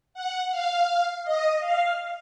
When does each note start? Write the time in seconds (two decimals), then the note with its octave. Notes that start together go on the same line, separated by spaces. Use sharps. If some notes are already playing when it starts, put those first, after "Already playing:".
0.14 F#5
0.51 F5
1.24 D#5
1.60 F5